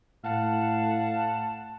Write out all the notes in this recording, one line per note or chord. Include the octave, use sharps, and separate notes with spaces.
A2 F5 F#5 A5